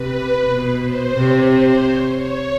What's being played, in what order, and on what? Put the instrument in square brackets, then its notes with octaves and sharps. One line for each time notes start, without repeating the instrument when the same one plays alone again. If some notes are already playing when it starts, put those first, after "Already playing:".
Already playing: [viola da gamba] C3 [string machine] B4
[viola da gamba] B2
[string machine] C5
[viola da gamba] C3 [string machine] C#5
[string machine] C5
C#5
C#5